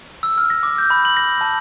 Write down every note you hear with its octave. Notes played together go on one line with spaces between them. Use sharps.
E6
F6
A#6
D6
G6
B5
F#7
A#6
A5